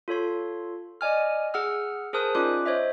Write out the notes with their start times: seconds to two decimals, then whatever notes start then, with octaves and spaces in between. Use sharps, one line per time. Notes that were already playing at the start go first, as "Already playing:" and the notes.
0.08 F4 A4 C#5 C6
1.01 D5 D#5 G#5 F6
1.54 G#4 F#5 E6 F6
2.13 G#4 A#4 C5 A5 D#6 F#6
2.35 C#4 D#4 F4 D5 D6 F#6
2.66 C5 C#5 D#5 E5